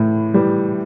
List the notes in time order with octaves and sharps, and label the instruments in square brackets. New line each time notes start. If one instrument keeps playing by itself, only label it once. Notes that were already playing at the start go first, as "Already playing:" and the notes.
Already playing: [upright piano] A2 E3
E3 G3